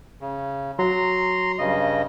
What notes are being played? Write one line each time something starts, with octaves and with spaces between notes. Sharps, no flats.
C#3
F#3 A#5 C6
G2 C#3 D#5